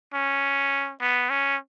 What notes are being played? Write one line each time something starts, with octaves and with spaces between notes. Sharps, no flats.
C#4
B3
C#4